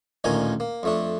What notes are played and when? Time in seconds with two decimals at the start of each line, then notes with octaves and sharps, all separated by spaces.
0.24 A1 D2 A#2 D#3 G#5 A#5
0.60 A#3
0.83 F2 A3 D4